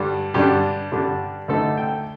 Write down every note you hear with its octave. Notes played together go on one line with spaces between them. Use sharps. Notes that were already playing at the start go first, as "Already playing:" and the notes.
Already playing: G2 D3 G3 D4
G2 D3 G3 D4 G4
G2 D3 G3 D4
D2 D3 A3 D#4 A4
G5